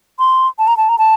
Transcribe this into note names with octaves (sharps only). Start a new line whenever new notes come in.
C6
A5
A#5
A5
A#5
A5